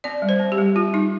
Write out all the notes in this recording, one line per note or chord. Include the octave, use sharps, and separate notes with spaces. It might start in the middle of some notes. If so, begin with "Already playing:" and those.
C4 D5
G3
C5
C4
G4
G3
C4 F4
G3 D#4